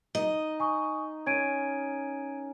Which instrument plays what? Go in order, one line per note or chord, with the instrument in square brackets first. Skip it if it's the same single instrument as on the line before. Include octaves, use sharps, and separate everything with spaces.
[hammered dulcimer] D#4 [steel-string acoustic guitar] D#5
[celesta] G#5 C#6 D#6
[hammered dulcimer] C#4 A#4 [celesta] G#6 D7 D#7